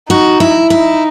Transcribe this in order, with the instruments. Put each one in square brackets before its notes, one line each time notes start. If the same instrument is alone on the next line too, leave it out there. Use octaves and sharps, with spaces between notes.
[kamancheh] D#4 [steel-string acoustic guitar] F#4
[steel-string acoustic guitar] E4
[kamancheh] D#4 [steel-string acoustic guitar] E4